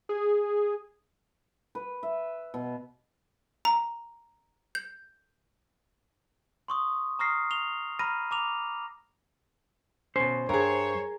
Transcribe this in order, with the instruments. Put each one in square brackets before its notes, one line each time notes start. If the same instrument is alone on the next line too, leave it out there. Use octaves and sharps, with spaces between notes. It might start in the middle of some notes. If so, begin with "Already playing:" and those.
[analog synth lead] G#4
[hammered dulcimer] B4
E5
B2
[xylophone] A#5
G6
[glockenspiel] C6 C#6 D#6
A#5 C#6 D#6 F6 A#6 C7
F7 G7
A#5 B5 F6 A#6 D#7
A#5 D6 F7
[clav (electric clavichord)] B2 C#4 [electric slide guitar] C5
[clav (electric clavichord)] G2 [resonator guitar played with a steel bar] G#4 A#4 [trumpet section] C#5